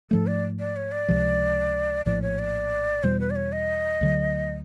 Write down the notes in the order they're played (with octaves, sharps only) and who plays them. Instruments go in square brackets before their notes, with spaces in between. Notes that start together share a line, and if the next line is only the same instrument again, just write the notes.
[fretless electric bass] G#2 F3 A3 [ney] A4
[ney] D5
D5
C#5
D5
[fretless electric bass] C#2 C3 F3
[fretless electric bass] A#1 A2 F3 [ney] D5
[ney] C#5
D5
[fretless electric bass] E2 B2 G3 [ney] C5
[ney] B4
D5
C#5
D#5
[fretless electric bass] D2 D3 F#3